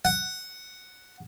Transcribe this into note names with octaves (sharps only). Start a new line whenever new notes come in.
F#5